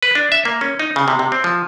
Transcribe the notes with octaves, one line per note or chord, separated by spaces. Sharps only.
B4
D4
E5
A#3
C#4
D#4
C#3
C3
C3
C4
F3